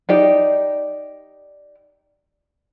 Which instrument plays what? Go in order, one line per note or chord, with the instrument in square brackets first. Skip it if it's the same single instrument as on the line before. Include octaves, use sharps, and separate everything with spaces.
[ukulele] D#4 G4 D5